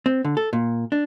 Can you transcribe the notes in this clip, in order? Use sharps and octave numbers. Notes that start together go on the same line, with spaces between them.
C4
D3
A4
A#2
D4